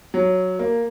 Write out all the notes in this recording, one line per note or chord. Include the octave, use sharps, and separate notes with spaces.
F#3
A#3